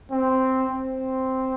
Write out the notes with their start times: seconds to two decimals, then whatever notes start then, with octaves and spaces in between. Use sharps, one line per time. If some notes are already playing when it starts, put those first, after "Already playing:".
0.11 C4
0.71 C4